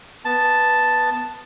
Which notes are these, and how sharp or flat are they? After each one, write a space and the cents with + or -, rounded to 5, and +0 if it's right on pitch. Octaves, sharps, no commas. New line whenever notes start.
B3 +0 A5 +0